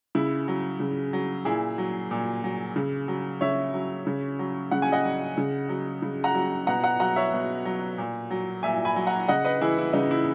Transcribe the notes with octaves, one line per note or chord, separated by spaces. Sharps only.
C#3 E4
F#3
C#3
F#3
A#2 E4 G#4
F#3
A#2
F#3
C#3
F#3
C#3 C#5 E5
F#3
C#3
F#3
C#3 F#5
G#5
D#5 F#5
F#3
C#3
F#3
C#3
F#5 A#5
F#3
B2 F#5 A#5
F#5 A#5
F#3 F#5 A#5
C#5 E5
B2
F#3
A#2
F#3
A#2 E5 G#5
G#5 B5
F#3
F#5 A#5
C#3 D#5 F#5
B4 D#5
E3 E4 G#4
E4
C#3 D#4
E4